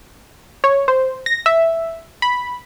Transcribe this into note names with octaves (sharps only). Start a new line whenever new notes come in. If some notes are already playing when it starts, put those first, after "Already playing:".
C#5
C5
A#6
E5
B5